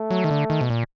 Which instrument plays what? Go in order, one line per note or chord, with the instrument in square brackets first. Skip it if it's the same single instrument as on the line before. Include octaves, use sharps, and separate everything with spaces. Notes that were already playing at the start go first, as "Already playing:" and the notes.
Already playing: [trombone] A3
[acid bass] F#3
D#3
D3
D#3
B2
A#2